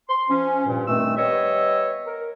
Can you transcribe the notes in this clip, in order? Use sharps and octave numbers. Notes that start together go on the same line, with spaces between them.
C6
F3 C#4
G2 A#2
G2 D#3 A3 C4 E6
G3 B3 C#5 D#5 E5
A#4